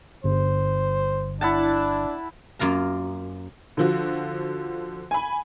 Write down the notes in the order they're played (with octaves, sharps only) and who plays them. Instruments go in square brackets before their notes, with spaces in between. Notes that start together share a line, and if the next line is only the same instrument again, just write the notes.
[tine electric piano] G1 [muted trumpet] C5
[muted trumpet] D4 [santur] E4 F#5 A5
[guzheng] F#2 A#3 F4 A#5
[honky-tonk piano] D3 F3 F#4
G#5 B5